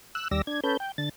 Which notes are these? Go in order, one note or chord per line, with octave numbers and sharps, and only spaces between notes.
E6 F#6
D#2 G3 D5 E6 A#6
D4 G#6
C#4 A4 B4 G6
G5
D3 A6